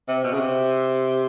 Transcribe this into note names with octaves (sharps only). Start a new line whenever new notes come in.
C3
B2
C#3
C3